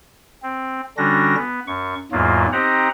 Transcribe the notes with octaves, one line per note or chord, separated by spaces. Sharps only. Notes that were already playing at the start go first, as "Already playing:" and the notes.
C4
D3 G3 C#4 D4 F#4 A#6
B3
F#2 C#6
E2 G#2 F#3 A#3 F4
C4 D#4 G4 C5 F#5 A#5